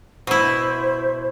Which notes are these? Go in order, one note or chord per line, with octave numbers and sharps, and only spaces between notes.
B2 E4 C5